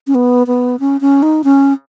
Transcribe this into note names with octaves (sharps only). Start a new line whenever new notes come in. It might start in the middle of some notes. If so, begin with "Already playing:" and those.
C#4
B3
B3
C#4
C#4
D#4
C#4